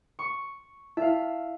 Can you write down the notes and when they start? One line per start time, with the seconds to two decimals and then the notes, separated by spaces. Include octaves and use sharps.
0.19 C#6
0.97 E4 E5 F5